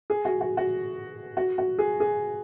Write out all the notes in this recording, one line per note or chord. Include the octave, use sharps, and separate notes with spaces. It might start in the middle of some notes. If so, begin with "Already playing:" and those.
G#4
F#4
F#4
F#4
F#4
F#4
G#4
G#4